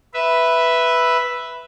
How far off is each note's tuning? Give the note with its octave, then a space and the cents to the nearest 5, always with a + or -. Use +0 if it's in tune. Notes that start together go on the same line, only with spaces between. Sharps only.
B4 +0 E5 +0